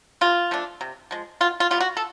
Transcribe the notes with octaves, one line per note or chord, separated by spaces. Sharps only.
C3 F4
F3 A3 D4
C3
F3 G#3
B2 F4
F4
G3 B3 F4
F#4
A4